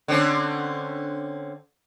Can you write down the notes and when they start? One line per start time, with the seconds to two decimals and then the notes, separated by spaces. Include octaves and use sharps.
0.08 D3 C4 C#4